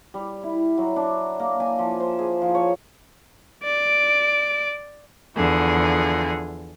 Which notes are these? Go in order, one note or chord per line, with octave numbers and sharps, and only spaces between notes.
G3
E4
F#3
D4
A#3
G#5
F3
C5
G#4
F3
C#5
D5 D7
E2 D3 F3 G#4